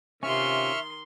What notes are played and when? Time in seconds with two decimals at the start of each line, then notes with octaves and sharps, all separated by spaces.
0.23 C3 D#3 C#4 F4 E5 C6 C#6 F6